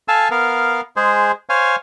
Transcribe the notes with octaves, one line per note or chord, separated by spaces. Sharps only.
A4 F5 G#5 A5 E6
B3 A#4 F5
G#3 G#4 C5
C5 C#5 F5 G#5